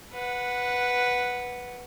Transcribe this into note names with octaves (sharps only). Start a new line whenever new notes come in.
B4 F#5